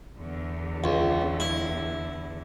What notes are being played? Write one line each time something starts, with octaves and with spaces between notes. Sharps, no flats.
E2 D3
C#2
E4